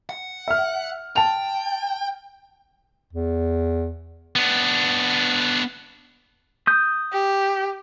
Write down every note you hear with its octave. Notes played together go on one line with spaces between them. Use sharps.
F#5
E5 F6
G5 A5 F7
E2
B3 D4
D#6 G6
G4